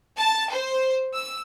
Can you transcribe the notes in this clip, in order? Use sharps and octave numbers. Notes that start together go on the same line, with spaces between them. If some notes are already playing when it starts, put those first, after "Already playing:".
A5
C5
E6